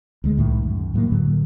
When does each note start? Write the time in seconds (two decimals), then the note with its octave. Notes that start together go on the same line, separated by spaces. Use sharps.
0.24 D2 G#3
0.37 C2 A2 D#3 A3
0.63 F#2
0.94 A2 F#3 G#3 A#3
1.12 A2 D3 F#3